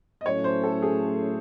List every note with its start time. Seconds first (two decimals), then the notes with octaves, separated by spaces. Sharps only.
0.21 D#5
0.26 A2 F#3 A3 C#4 C#5
0.44 C5
0.63 A4
0.82 G#4